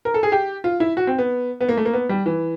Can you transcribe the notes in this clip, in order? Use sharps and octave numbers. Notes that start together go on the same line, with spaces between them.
A#4
A4
G#4
G4
F4
E4
F#4
C4
B3
B3
A#3
A3
A#3
B3
G3
E3